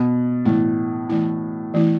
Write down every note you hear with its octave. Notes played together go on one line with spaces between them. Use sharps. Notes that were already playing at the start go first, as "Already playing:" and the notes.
Already playing: B2
A2 E3 A3 E4
E3 A3 E4
E3 A3 E4